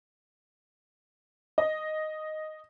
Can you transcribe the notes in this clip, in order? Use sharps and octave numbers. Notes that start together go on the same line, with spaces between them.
D#5